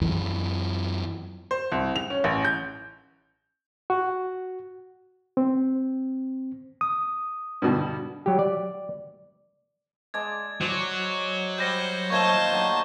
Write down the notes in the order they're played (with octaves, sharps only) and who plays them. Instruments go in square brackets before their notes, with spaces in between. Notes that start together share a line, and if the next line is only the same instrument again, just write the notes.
[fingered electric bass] F#2 E3
[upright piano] C5
C2
F7
C#4
A1
G6
[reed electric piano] F#4
C4
D#6
[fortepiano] G2 B2 D3
[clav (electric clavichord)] F#3 G4
D5
[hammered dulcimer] G#3 D5 A5 [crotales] G#6
[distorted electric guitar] F#3 [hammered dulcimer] C5 D5
[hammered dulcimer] G3 [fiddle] C5 F#5 [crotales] G6 A#6
[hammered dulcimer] A#2 D#3 A3 [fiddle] C5 A5 [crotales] C#6 G#6 G7
[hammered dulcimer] D3 F#3 D4